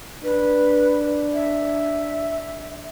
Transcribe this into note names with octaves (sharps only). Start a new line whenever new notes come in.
D4 B4
E5